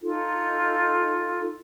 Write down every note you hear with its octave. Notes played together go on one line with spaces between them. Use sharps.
D#4 F4 A4